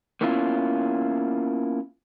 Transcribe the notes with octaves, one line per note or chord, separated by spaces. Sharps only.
A#3 B3 C#4 E4 F4